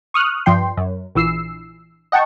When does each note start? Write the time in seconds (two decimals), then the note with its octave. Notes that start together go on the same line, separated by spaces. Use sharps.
0.14 C#6 D#6 F6 F#6
0.46 G2 F3 G5 C6
0.77 F#2
1.15 A#1 E3 E6 C7
2.12 D#5 F#5 G5 A5 C#6